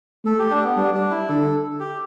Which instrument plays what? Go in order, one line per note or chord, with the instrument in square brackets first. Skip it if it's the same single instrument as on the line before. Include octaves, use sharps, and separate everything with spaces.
[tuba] A3 [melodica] A4
[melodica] G4
D4
B3
[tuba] G3 [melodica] D4
[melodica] D4
E4
[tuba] D3 [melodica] A4
[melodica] G4